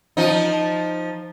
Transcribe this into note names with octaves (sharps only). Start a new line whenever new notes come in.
F3 D#4